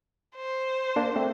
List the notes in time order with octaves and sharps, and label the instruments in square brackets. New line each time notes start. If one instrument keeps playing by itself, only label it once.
[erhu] C5
[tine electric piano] A#3 D4
A3 C4